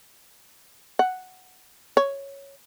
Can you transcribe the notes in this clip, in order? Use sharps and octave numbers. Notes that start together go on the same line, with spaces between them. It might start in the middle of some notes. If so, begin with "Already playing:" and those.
F#5
C#5